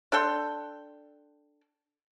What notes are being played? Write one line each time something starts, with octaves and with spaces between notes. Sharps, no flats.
D4 A4 G5 C6